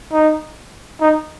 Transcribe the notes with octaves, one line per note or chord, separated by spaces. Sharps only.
D#4
D#4